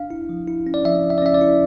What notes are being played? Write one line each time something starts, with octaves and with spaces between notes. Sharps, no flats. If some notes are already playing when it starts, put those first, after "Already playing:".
Already playing: D4 F5
E4
F3
E4
C#4
D5
F3 E5
F3
E5
D5
C#4 E5
D5
E4